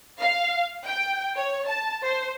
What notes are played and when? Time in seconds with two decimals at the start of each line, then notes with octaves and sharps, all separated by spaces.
0.19 F5
0.84 G5
1.36 C#5
1.67 A5
2.05 C5